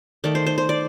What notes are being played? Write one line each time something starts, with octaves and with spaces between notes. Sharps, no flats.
D#3 A3 D5
C5
C5
C5
D5